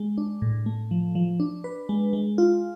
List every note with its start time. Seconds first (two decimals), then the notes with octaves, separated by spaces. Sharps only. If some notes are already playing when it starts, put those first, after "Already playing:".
Already playing: G#3
0.18 D4
0.42 A2
0.66 A3
0.91 F3
1.15 F3
1.40 D4
1.64 B4
1.89 G#3
2.13 G#3
2.38 F4